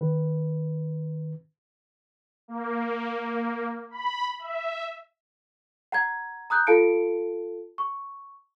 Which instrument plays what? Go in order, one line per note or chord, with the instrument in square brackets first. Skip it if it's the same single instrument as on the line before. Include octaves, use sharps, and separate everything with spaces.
[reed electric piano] D#3 B4
[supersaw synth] A#3
B5
E5
[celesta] F#5 A#5 G#6
A#5 D#6 F#6 G6
F4 A4 F5 A5 C#7 D7
C#6